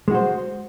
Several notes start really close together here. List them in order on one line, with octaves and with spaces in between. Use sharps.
G#3 F#4 C5